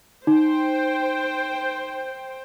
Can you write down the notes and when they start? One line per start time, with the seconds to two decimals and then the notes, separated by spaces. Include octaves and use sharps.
0.27 D#4 C5 G5